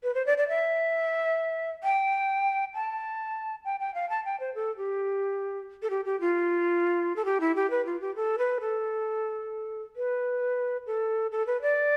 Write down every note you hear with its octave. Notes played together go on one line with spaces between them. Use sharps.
B4
C5
D5
D5
E5
G5
A5
G5
G5
F5
A5
G5
C5
A4
G4
A4
G4
G4
F4
A4
G4
E4
G4
B4
F4
G4
A4
B4
A4
B4
A4
A4
B4
D5